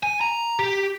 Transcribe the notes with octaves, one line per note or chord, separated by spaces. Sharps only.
G#5
A#5
G4